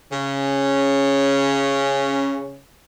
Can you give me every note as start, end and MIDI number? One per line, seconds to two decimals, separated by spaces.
0.12 2.61 49
0.12 2.61 61